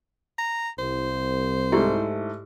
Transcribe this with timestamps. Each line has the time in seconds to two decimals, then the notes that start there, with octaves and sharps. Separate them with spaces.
0.39 A#5
0.79 C2 C5
1.72 G#2 A3 E4 G4 D5